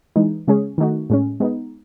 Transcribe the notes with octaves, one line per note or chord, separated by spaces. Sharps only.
E3 G#3 D#4
C#3 G#3 C#4 G#4
D#3 A3 D#4 F#4
A2 G#3 C#4
G#3 B3 D#4